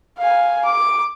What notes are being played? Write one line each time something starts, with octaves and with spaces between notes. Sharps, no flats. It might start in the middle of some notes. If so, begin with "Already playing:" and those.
F5 G#5
D6